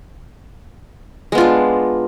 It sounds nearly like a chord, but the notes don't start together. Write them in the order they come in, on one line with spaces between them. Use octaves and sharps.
G#3 B3 F4 D4